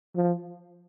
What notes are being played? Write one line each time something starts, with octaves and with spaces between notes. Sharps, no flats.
F3